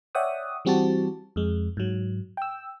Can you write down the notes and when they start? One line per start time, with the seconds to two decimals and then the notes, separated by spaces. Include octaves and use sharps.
0.15 C#5 D5 E5 F#5 G5 D#6
0.65 E3 G3 C4 F#4 G4 A5
1.36 F2 G#3
1.77 G#2 F#3
2.37 G5 E6